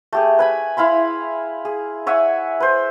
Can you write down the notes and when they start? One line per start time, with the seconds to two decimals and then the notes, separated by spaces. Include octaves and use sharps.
0.13 A3 G4 G#4
0.39 B4 G#5 B5
0.77 E4 F5 B5 C6
1.65 G#4
2.07 C#5 E5 F#5 G#5
2.60 B4 C5